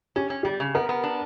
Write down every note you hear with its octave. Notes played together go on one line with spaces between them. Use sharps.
C#4 G4
C#4
G3 G4
C#3
B3 A#4
B3
D4